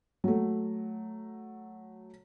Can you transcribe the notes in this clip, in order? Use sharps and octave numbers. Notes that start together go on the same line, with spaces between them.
F#3 A3